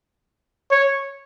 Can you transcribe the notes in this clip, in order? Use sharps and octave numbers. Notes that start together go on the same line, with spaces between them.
C#5